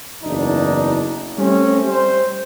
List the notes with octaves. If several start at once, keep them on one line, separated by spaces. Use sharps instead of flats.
F#1 E2 D4 D#4
G3 A3 C4 C#4
G3 C5